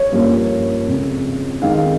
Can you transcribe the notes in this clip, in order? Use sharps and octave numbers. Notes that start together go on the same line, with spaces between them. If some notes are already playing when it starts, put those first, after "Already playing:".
Already playing: C#5
G2 F3 A#3 C#4 F4
F2 C#3 G#3
F2 D#3 G#3 D#4 F5